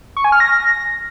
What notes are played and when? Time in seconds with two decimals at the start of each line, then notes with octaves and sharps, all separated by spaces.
0.17 C#6
0.24 G#5
0.32 F6
0.40 A#6